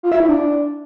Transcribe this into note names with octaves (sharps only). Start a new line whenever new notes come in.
F4
E5
E4
D4